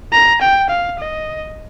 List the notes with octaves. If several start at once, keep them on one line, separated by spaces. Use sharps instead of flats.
A#5
G5
F5
D#5